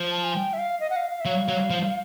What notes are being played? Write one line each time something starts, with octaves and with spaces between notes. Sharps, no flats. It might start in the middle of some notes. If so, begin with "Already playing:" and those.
Already playing: F3
A5
G#5
G5
E5
F5
D#5
F#5
F5
F5
E5
F#3 F5
F#3
F3